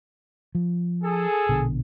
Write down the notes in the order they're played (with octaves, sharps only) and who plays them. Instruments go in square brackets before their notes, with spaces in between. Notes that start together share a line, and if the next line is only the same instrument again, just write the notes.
[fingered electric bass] F3
[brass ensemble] G#4 A4
[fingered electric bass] A#1 B2 D3